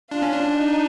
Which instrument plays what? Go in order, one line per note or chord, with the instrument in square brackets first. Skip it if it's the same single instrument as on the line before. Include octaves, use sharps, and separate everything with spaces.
[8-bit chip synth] D4 [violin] F4
[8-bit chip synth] C#4
D4
[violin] D#4